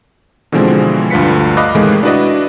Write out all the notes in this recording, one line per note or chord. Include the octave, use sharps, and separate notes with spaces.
B2 D3 E3 F3 G#3 C4
D2 G2 F4 B4 B6 C#7
D#5 F5 B5 D6 F#6
A2 C3 D#3 E3 G#3 A3
D4 E4 F#4 B4 D5 D#5